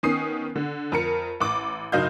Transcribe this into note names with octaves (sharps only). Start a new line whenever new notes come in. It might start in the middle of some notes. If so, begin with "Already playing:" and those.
D#3 B3 C#4 D#6 C7
D3
F2 A#4 C#7
A1 D6
F#1 F#3 D#4 D#5 F5 G6